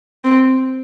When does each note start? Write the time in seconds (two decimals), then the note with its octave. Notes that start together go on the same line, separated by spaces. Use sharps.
0.24 C4